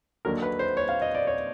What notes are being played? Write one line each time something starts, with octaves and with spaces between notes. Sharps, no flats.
D#2 D3 F#3 A#4
B4
C5
C#5
F5
D#5
D5
C#5